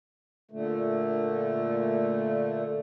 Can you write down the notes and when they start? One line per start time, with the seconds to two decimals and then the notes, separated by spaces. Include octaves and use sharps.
0.51 A#2 D3 A3